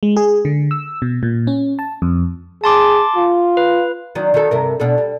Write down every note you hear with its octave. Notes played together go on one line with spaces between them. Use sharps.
G#3
G#4
D3
E6
B2
A#2
C#4
A5
F2
G#4 A5 C6 D6
F4
B4
D#3 F#3 D4
D#3 F#3 A4
G2 C3 A#4
B2 D4 A4
G3